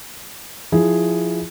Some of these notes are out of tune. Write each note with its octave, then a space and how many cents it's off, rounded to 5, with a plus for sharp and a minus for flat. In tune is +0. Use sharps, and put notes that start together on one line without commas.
F3 +0 E4 +0 G#4 +0